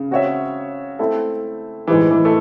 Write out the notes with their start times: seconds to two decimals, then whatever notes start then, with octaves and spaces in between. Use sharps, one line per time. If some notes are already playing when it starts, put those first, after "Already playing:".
Already playing: C#3
0.11 C4 F#4 C#5 E5
0.99 A3 C4 E4 A4
1.87 A2 E3 G#3 D#4 G#4 C5
2.11 E3
2.25 A3